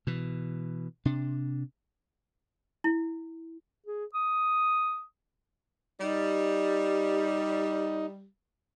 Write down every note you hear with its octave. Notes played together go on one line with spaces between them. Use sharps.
B2 E3
C3 D4
E4
G#4
D#6
G3 D#4